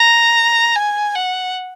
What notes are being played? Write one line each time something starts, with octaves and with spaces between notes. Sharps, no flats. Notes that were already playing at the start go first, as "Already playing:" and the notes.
Already playing: A#5
G#5
F#5